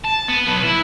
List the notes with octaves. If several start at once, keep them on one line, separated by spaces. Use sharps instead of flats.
A5
B3
B1 B4
E4